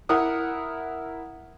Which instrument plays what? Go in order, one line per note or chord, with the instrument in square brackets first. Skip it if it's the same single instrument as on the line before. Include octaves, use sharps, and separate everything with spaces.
[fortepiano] E4 A#4 F#5 D#6